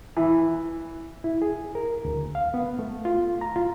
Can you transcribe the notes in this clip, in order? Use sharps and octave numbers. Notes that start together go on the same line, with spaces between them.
E3
E4
G#4
A#4
D2
F5
B3
A3
F4
A#5
F4